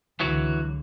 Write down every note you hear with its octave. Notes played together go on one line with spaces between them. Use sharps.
C#2 D3 E3 F#3 F#4